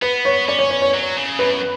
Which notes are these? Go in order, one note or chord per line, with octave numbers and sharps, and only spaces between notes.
B3 B4
C#5
C#4 D5
C#5
C#5
C#5
F#3
C#3
F#2 B4